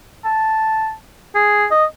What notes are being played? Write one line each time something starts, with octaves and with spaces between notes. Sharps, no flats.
A5
G#4
D#5